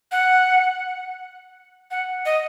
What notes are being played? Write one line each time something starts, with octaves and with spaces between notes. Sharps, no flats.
F#5
F#5
D#5